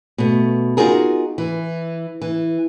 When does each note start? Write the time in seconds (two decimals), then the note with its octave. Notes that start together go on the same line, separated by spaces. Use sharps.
0.18 B2 A3
0.77 D#4 F4 F#4 G#4 A#4
1.38 E3
2.22 E3